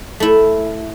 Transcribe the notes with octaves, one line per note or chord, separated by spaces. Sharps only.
A3 E4